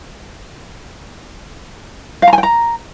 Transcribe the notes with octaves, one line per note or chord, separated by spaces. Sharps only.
F5
A#5
G#5
G5
A#5